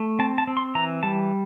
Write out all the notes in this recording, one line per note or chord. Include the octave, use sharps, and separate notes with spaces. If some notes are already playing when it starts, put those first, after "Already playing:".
Already playing: A3
C4 A5
A5
C4
C6
E3 A#5
G3 A5